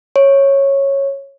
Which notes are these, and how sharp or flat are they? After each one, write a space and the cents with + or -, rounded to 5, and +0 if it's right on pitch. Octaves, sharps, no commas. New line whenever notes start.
C#5 -10